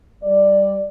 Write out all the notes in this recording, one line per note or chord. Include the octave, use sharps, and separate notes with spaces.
G3 D5